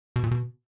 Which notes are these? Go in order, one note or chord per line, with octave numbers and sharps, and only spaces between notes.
B2
A#2
B2